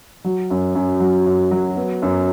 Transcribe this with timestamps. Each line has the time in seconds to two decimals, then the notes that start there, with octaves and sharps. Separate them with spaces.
0.24 F#3
0.50 F#2
0.75 F#2
1.00 F#3
1.26 F#2
1.51 F#3
1.76 B3
2.02 F#2